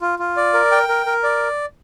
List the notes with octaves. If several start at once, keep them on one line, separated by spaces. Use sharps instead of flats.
F4
F4
D5
A#4
G5
A#4
A#4
D5